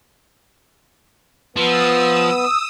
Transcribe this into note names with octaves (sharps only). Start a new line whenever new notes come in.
F3 B3 B4 D#6 E6